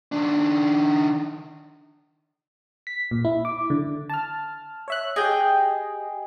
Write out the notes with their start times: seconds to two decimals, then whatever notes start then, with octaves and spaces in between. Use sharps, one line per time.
0.12 D#3 D4
2.87 B6
3.11 A#2
3.25 E4
3.45 D6
3.70 D3
4.09 A5 F6
4.88 C#5 E5 F#6
5.16 G4 G#4 D#5 G5